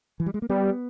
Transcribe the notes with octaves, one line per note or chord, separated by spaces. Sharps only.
E3
G3
G#3
A#3
G3 B3